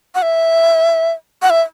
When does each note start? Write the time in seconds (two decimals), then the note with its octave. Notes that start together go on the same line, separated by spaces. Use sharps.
0.15 F#5
0.22 E5
1.42 F#5
1.50 E5